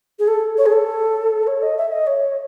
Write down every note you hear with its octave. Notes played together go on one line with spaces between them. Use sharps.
G#4
A4
C#5
G#4
A4
C#5
D#5
E5
D#5
C#5